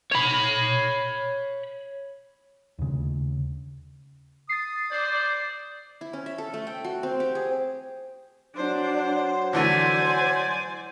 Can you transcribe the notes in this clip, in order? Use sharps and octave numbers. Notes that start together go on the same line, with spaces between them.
C#5 B5
D#2 C#3
D#6 A6 C7
C5 D5
E4
C#4
E5
A4
A3
G5
F#4
C4
G4
G#4
F#3 D4 C5
D3 E3 A3 C5 D5 G#5